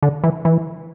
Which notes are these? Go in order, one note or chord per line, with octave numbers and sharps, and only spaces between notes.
D3
E3
E3